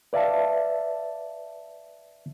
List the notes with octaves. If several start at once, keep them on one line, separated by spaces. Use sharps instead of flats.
B4 D5 E5 F5 A5